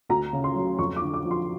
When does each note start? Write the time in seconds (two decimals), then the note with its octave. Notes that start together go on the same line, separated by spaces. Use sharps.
0.09 D2 A#5
0.33 C#3
0.44 C6
0.56 F#3
0.78 F2 C#6
0.96 D6
1.02 D3
1.14 D6
1.25 F3
1.31 C6